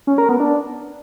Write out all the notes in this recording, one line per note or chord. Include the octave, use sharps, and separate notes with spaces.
C#4
A#4
B3
D4